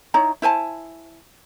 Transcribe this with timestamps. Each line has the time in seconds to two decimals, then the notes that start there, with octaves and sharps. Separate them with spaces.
0.14 D#4 E4 C#5 A#5
0.42 E4 C5 G#5 A5